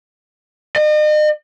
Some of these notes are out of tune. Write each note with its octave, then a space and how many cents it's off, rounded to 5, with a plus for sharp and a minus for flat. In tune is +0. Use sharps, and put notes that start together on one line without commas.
D#5 -40